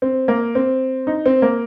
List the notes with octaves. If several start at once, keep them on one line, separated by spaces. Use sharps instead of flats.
C4
A#3
C4
D#4
C4
A#3